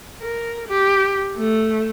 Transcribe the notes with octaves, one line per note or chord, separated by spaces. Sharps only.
A#4
G4
A3